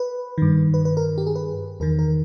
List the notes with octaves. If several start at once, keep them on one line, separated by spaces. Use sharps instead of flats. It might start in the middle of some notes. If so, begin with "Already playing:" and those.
Already playing: B4
G2 D#3
B4
B4
A#4
G4
G#4
B4
E2 D#3 A#4
A#4